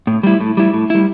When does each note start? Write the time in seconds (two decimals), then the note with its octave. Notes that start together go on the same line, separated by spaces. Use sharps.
0.07 A2
0.23 G3 E4
0.41 A2
0.57 G3 E4
0.73 A2
0.90 G3 E4